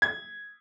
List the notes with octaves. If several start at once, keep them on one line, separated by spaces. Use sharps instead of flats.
G#6